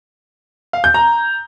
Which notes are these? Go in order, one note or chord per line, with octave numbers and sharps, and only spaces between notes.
F5
G6
A#5